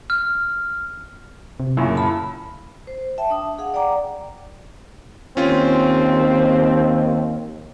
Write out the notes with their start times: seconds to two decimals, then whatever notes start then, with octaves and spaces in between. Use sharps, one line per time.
0.10 F6
1.60 C3
1.77 F#2 A#2 C#3 E4
1.95 A5 B5
2.87 C5
3.18 E5 G5 A5
3.30 D4 D#6
3.58 G#4 F5 F#5
3.74 D5 F#5 G5 A#5 D6
5.37 D#2 C4 C#4 F4